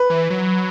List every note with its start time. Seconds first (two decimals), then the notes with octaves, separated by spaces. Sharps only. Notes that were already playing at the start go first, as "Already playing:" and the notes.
Already playing: B4
0.10 E3
0.30 F#3